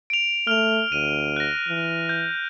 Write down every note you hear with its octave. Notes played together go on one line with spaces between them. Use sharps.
D7 F7
A3 F6 F7
D2 D#7
F#6 A#6
E3
G6